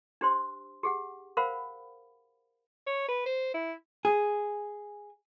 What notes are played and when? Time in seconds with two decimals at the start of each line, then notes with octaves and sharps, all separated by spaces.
0.21 D4 G4 C5 C6
0.83 G4 G#4 F#5
1.37 A#4 C5 F5 F#5 B5
2.87 C#5
3.08 B4
3.26 C5
3.54 E4
4.05 G#4